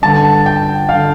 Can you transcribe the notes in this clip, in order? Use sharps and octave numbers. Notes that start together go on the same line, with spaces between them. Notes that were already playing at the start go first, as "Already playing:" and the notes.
G2 D3 A5
G5
D3 F5